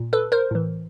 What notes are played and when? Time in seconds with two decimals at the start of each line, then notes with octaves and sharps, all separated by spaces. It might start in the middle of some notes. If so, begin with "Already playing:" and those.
Already playing: A#2
0.13 A4 B4
0.32 A#4 C5
0.51 A2 E3